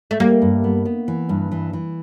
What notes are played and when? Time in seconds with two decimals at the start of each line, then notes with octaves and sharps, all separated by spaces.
0.11 A3
0.20 G3 A#3
0.42 G2
0.64 B3
0.85 B3
1.08 E3
1.29 G2
1.52 E3
1.73 E3